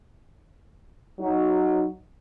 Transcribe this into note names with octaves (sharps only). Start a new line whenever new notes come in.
F#3 D#4